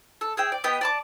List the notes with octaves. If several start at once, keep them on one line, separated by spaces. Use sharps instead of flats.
A4
G#4 E5 G5
D5
B3 G4 D#5 G5
D5 A5 D6